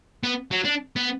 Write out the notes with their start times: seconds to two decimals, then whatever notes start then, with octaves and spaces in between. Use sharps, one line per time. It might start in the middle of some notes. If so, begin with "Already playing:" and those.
0.23 B3
0.51 F#3
0.65 D4
0.96 B3